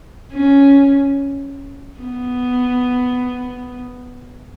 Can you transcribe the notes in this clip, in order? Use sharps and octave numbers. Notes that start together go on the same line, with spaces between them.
C#4
B3